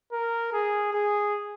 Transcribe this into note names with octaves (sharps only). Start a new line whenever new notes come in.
A#4
G#4
G#4